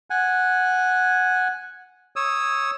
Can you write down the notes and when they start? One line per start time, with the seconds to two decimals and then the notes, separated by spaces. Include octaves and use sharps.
0.10 F#5 G#5
2.16 C#5 D#6 E6